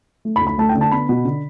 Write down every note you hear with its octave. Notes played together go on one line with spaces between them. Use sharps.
A3
B5
D2
B5
A3 A5
G5
D3
A5
B3 B5
B2
D3